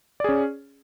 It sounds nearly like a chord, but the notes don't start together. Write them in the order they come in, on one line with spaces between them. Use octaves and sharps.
D5 G#4 C#4